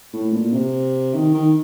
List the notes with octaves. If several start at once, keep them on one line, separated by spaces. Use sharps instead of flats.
A2
A#2
C3
D#3
D#3